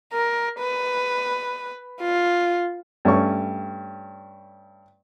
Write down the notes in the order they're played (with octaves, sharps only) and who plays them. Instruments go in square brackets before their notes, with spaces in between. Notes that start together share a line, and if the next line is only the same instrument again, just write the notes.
[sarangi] A#4
B4
F4
[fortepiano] G2 A3 C#4 C#6